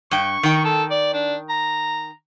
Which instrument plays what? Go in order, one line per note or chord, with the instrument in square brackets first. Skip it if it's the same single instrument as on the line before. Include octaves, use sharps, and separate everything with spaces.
[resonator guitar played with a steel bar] G2 G5 [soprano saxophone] C#6
[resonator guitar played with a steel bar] D#3 G5
[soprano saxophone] A4
D5
D4
A#5